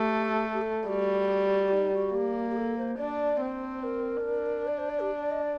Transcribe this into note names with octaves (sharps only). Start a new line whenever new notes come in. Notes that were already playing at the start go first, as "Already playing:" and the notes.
Already playing: A3 G4
A4
G4
A4
G3 F#4
D#4
F#4
A#3 G4
G4
A4
C5
D4 D5
C4 C5
A#4
D4
D5
C5
D5
G4
D5
D#5
D5